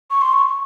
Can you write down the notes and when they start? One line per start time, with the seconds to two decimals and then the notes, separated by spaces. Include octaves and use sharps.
0.11 C#6
0.22 C6
0.33 C#6